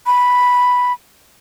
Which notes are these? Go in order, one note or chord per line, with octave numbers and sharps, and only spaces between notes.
B5